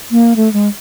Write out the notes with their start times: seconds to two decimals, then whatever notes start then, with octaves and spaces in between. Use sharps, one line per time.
0.11 A#3
0.36 A3
0.53 G#3